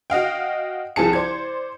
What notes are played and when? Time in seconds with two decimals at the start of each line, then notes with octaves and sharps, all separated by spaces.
0.10 F#4 D#5 F5 G5
0.96 C2 F3 G#4 A5 C#7
1.13 C5 D5 G#6